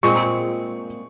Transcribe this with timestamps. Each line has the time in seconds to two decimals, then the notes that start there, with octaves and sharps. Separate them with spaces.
0.03 A#2 G#3 C4 C#6